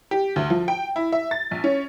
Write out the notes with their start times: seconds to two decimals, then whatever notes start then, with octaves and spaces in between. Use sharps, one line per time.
0.11 G4
0.36 D2
0.50 F3
0.68 G5
0.96 E4
1.12 E5
1.31 A6
1.51 A#1
1.64 C#4